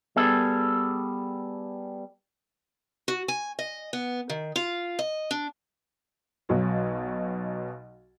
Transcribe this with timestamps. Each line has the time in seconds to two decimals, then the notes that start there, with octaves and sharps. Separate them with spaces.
0.16 G3 B3 G#4 A4
3.08 F#4
3.28 G#5
3.59 D#5
3.93 B3
4.30 D#3
4.56 F4
4.99 D#5
5.31 D4
6.49 B1 B2 F#3